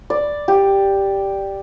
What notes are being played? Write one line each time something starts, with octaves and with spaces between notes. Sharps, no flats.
D5
G4